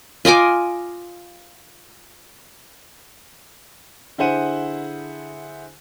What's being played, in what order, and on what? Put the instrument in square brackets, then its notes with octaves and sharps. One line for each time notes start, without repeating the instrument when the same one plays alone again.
[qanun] F4 D#5 G#5 D6
[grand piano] D3 E4 G#4 C5 F#5 D#7